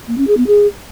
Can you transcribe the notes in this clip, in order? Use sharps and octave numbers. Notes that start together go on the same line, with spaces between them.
A#3
C#4
G#4
B3
G#4